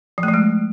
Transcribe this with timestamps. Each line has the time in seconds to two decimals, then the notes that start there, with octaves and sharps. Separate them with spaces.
0.18 F3
0.23 A3
0.28 F3
0.34 G#3